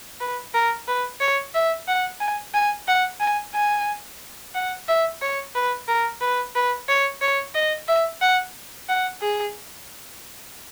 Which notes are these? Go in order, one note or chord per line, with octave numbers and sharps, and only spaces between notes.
B4
A#4
B4
C#5
E5
F#5
G#5
G#5
F#5
G#5
G#5
F#5
E5
C#5
B4
A#4
B4
B4
C#5
C#5
D#5
E5
F#5
F#5
G#4